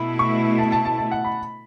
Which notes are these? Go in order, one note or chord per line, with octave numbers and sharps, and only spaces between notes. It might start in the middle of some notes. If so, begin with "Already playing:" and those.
Already playing: B2 A3 E4 B5
C#6
A5
A5
A5
A5
F#5
B5